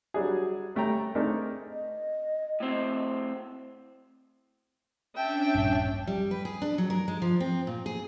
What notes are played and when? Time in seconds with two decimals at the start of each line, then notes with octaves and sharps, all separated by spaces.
0.14 F#3 G3 D4 G#4
0.75 G3 A3 C#4 G5 A#5
1.15 A3 C4 D4 D#4 G#4 A#4
1.70 D#5
2.60 A2 C4
5.16 C#4 D4 E5 G5 A5
5.55 D#1 A#1 G2
6.07 G3
6.31 B4
6.45 G#4
6.62 D4
6.78 F#3
6.90 A#4
7.08 G#3
7.22 F3
7.40 C4
7.67 A#2
7.86 G#4